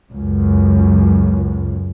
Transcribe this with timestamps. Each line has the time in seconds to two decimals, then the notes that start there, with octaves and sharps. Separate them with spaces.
0.12 C#2 F#2